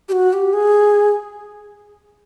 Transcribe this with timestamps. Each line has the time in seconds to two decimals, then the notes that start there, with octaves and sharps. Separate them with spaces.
0.09 G4
0.12 F#4
0.33 G4
0.53 G#4